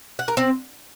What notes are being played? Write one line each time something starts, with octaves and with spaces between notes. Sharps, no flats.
F#5
A#4
C4